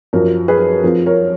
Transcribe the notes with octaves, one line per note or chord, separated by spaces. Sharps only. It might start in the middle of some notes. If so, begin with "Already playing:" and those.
F#2 F3 A#4
G#4 B4
F2 F3 A#4
A#4 C#5